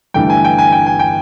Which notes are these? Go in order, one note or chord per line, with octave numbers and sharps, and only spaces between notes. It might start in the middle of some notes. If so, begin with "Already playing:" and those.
G1 G2 E3 A3 G5
G#5
G5
G#5
G5
G#5
G5